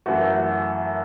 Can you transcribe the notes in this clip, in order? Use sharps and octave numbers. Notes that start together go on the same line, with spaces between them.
F#2 E3 A3 F#4